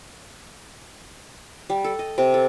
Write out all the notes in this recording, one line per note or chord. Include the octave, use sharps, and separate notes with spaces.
G3
A4
D#5
C3
A4